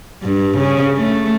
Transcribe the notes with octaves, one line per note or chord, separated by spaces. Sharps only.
G2
C#3
A3